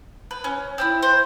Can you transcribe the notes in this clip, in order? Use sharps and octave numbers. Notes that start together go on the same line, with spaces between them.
B4
C#4
C4 D4 E4
C5